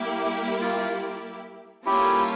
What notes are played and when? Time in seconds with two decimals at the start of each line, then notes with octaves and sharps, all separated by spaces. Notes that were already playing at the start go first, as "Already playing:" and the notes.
Already playing: G3 A#3 E4 G4
0.61 F4
1.86 G3 A#3 C#4 E4 F4 G4 A4